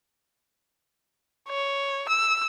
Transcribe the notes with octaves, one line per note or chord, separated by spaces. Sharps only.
C#5
E6